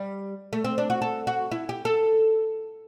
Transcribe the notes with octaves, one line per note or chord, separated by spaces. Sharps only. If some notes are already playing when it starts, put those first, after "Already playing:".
Already playing: G3
A3
C4
D4
F#4
A4
F#4
E4
G4
A4